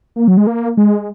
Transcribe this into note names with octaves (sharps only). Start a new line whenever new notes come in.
A#3
F#3
G#3
A#3
G#3